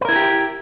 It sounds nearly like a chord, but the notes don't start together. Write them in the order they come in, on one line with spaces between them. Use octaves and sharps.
B4 A#4 E4 G#4 G4